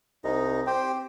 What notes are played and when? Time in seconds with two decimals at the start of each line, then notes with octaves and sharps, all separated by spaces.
0.24 C2 D#4 D#5
0.67 C4 G4 C5 G5